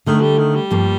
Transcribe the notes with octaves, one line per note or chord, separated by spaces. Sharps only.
D3 D#3 A3 D4
G3
D#3
G3
G2 F3 A#3